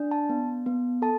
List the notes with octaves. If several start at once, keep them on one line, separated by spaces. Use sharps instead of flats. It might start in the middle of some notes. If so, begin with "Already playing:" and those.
Already playing: D4
A5
B3
B3
A4 A5